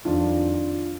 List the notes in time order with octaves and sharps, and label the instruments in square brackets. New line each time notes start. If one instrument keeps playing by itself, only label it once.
[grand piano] F2 D#3 D4 F4